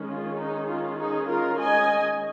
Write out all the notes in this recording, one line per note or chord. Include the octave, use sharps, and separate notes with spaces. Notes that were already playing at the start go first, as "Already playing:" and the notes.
Already playing: D#3 G#3 C#4
F4
D#4
F4
D#4 G#4
F4 A#4
D#5 G#5